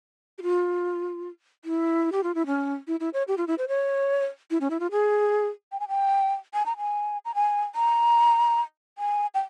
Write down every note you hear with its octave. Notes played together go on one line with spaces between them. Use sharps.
G4
F4
E4
G4
F4
E4
C#4
E4
E4
C#5
G4
F4
E4
C5
C#5
E4
C#4
E4
F4
G#4
G5
G#5
G5
G#5
A#5
G#5
A#5
G#5
A#5
G#5
G5